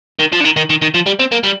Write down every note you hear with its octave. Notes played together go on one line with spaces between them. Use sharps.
D#3
F3
D3
D#3
D#3
D#3
D#3
F3
G3
C4
A#3
G3